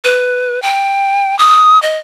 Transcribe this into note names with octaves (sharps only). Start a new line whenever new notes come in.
B4
G5
D#6
D#5